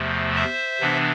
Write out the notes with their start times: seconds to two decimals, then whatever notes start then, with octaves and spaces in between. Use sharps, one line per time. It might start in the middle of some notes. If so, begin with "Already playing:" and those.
Already playing: E2 C3 F3 A3
0.36 C5 E5
0.80 C3 E3 B3 D4